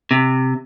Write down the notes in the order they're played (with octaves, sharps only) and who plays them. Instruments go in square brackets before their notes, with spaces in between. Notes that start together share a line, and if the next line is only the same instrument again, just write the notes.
[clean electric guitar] C3